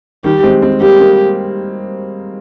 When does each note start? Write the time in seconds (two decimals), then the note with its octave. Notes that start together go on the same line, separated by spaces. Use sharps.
0.24 D#3 G3 G4
0.43 G#3 C4
0.62 G#3 C4
0.81 G3 A#3 G4
0.99 G3 A#3